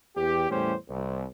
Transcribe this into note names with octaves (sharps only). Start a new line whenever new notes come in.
E2 G4
E2 A2 G3 C#4 G4 C5
C2